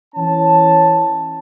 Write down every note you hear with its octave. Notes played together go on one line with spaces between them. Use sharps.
E3 C#4 A5